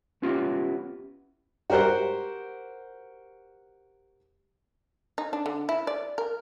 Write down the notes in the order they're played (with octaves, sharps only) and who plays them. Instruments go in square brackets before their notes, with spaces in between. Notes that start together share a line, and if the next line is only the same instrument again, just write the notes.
[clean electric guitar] B3 C#4 E4 F4 G4
[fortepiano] F#4 G4 A#4 C5 F#5
[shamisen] D#4
D4
D3
E4
D5
A#4